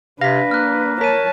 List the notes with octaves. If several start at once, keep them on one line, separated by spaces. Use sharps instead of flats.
C3 D4 B4 F5 A#6 B6
A#3 F6 F#6
A#4 C#5 A5 B6 D#7